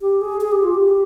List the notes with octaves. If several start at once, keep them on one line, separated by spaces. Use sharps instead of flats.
G4
G#4
G#4
G4
F4
G4